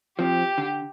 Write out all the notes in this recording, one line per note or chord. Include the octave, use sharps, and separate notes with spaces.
F3 C4 G4
D3